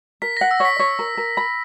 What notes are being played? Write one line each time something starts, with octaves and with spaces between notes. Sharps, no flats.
A#4 B6
F#5 A#6
E6
C#5
B6
C#5
A#4
A#4
B5